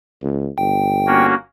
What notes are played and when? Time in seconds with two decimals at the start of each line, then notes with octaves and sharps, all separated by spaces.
0.22 C#2
0.58 G1 G5
1.06 A#3 C#4 F#4